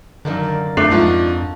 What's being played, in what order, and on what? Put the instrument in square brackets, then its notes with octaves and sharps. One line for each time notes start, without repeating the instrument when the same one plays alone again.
[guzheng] F#2 D#3 A#3 [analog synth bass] D3
[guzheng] D5
[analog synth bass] F2 [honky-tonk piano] A3 [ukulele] D4
[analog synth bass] F2 [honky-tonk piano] G#2 F3 [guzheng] F4 F#4 A4